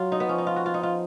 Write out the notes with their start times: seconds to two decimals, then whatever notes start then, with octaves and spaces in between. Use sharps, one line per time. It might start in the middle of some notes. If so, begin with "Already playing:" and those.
Already playing: F#3 F4
0.12 D#4
0.20 B3
0.29 F3 C#4
0.38 D#4
0.47 F4
0.56 F#4
0.66 F4
0.74 D#4
0.83 F4